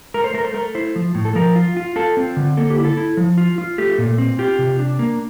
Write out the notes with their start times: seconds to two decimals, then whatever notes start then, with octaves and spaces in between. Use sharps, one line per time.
0.14 A3 A#4
0.24 C5
0.34 A3 A#4
0.45 C5
0.54 A3 A#4
0.75 E4 C5
0.96 F3
1.15 A2
1.25 A4
1.35 F3 A#4
1.56 F4
1.77 F4
1.96 F4 A4
2.17 C4
2.37 D3
2.57 A#3 A4
2.70 G4
2.78 E4
2.85 A4
2.97 E4
3.17 F3
3.38 F4
3.58 F4
3.78 A3 G4
3.98 A#2
4.18 C4
4.39 F4 G4
4.59 C3
4.79 D4
4.99 A#3